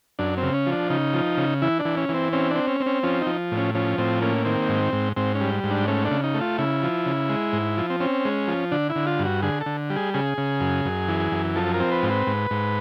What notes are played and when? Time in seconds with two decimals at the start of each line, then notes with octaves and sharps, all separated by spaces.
0.19 F#2 D4
0.37 C4
0.43 C#3
0.54 C#4
0.66 F3
0.72 D4
0.90 C#3 D#4
1.14 F3
1.37 C#3
1.62 E3 E4
1.79 D4
1.85 E3
1.97 C#4
2.09 E3 C4
2.33 C4 C#4
2.50 D4
2.55 C4
2.67 C#4
2.80 C4
2.86 C#4
3.03 F3 C#4
3.21 D#4
3.27 F3
3.51 A2
3.57 C#4
3.75 F3 C#4
3.98 A2 C4
4.21 A#3 C#4
4.45 D#3 C4
4.69 G#2
4.93 G#2
5.17 G#2 C4
5.35 C#4
5.41 G3
5.64 G#2
5.70 D4
5.88 A3 C#4
6.05 D4
6.11 C#3
6.24 D#4
6.35 A3
6.41 F4
6.58 C#3 E4
6.83 F3
7.06 C#3
7.29 G#3
7.53 G#2
7.78 F3
7.90 C4
8.00 C4 C#4
8.25 G#3
8.48 F3
8.71 D3 D4
8.90 E4
8.96 D3
9.07 F4
9.19 G2
9.25 F#4
9.43 D3 G#4
9.61 A4
9.66 D3
9.90 G3
9.96 G#4
10.14 C#3 G#4
10.38 C#3
10.61 F#2
10.85 F#2
11.08 E3
11.32 F#2
11.56 F3 A4
11.74 A#4
11.80 C4
11.91 B4
12.03 G#2
12.10 B4
12.27 G#2
12.51 G#2